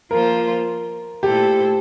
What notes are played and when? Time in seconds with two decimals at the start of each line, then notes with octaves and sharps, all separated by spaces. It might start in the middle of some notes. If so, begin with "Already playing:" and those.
0.11 F3 A#3 F4 A#4 C5
1.23 A#2 A3 E4 G4 A4 C5